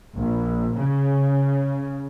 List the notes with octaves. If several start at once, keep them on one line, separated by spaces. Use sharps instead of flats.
A#1
C#3